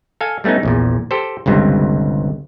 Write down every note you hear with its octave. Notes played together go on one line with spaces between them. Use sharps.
A4 F5 G#5
G3 A3 B3 C#4 D#4
A#1 E2 A#2
G4 A4 C5
G1 C#2 G2 C3